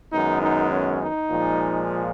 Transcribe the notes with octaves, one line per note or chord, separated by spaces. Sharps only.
F#2 D#3 G#3 B3 D#4
D#4
C#4
D#4
A#2 F3 G#3